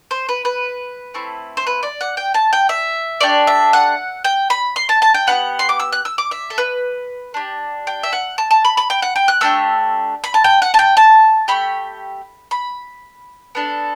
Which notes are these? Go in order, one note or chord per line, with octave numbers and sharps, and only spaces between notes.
C5
B4
B4
A3 C4 E4
C5
B4
D5
F#5
G5
A5
G5
E5
A3 D4 G4 D5
E5
F#5
G5
B5
C6
A5
A5
G5
B3 D4 G4 F#5
C6
D6
E6
F#6
E6
D6
E5
A4
B4
D4 G4
G5
E5
F#5
A5
A5
B5
B5
G5
F#5
G5
F#6
A3 D4 G4 E6
B5
A5
G5
F#5
A5
G5
A5
A3 E4 G4 B5
B5
B3 D4 A4